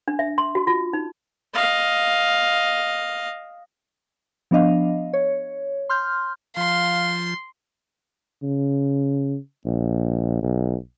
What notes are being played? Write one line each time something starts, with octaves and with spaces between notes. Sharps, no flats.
D4
E5
C6
F#4
F4
D#4
D#5 F5
F3 B3 D4 D#5 F5
C#5
C6 F6 G6
F3 F5 C6
C#3
A#1
B1